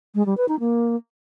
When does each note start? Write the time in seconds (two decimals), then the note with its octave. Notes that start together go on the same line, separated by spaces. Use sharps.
0.15 G#3
0.26 G3
0.37 B4
0.48 D#4
0.60 A#3